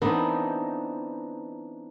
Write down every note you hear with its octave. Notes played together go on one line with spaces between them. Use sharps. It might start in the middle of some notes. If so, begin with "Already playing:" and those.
E3 B3 C4 D4 D#4